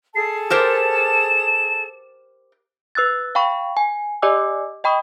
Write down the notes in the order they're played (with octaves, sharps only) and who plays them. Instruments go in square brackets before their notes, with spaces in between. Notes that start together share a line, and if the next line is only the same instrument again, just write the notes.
[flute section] G#4 A4 A5 [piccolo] C7
[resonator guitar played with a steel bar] G4 A#4 C5 [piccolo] E7
[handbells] B4 E6 F#6 A6
F5 G5 B5 C#6
G#5
G4 D5 D#5 G#5 D6 E6
D#5 G5 B5 C#6 D#6